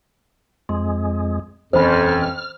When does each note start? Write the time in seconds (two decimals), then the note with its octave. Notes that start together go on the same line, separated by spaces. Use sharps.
0.69 F2 G#3 C6
1.73 D#1 F2 E3 C#4 C5 B5 F6